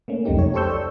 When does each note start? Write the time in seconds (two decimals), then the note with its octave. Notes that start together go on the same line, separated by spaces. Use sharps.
0.08 A3 A#3 C#4
0.25 C2 F2 F#3 A3 D#4 G4
0.39 C#5
0.54 G4 A4 C5 C#6 E6 G6
0.70 D5